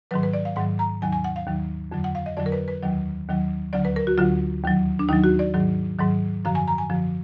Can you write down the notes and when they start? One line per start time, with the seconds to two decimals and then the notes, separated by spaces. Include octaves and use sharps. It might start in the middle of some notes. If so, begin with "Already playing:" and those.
0.11 G#2 D#3 F#3 B4
0.23 B4
0.34 D5
0.45 F5
0.56 G#2 D#3 F#3 F#5
0.79 A#5
1.02 D#2 D#3 F#3 G#5
1.12 G#5
1.24 F#5
1.36 F5
1.47 D#2 D#3 F#3
1.92 F2 D3 F#3
2.04 F#5
2.15 F5
2.26 D#5
2.37 F2 D3 F#3 D5
2.46 A#4
2.52 B4
2.68 B4
2.82 D#2 D#3 F#3
3.28 D#2 D#3 F#3
3.73 D2 D3 F#3 D5
3.85 B4
3.96 A#4
4.07 F#4
4.18 D2 D3 F#3 F4
4.64 D#2 D#3 F#3
4.99 D4
5.08 D#2 D#3 F#3 D#4
5.24 F#4
5.39 D5
5.54 G#2 D#3 F#3
5.99 G#2 D#3 F#3
6.45 F#2 D3 F3 F5
6.55 G#5
6.68 A#5
6.78 G#5
6.90 F#2 D3 F3